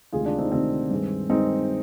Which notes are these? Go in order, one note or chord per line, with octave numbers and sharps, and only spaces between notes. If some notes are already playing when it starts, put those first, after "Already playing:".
D2 C3 D#3 G#3 F4 G#4
D4 F4
C4 D#4
D2 C3 D#3 G#3 C4
G2 D#3 G#3
G2 D#3 G#3 C4 D#4